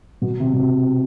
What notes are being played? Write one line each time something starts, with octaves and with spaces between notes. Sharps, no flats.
B2
C3
B2
C3